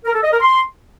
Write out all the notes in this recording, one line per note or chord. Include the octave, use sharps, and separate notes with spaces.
A#4
A4
D#5
A#4
C6